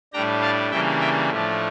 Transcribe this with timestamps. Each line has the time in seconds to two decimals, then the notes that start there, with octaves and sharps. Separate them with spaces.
0.13 A2 G3 D4 G5 A#5
0.42 F5 A5
0.71 C#3 E3 G3 A#3 D4 E5 G5
1.00 E5 G5
1.30 A2 F3 A3 D4